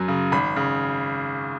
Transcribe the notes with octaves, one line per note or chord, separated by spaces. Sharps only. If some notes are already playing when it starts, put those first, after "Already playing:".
Already playing: F#2 F#3
C#3
G#1 B5
C#3